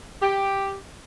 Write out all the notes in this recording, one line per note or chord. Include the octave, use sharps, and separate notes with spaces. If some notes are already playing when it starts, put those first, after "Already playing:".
G4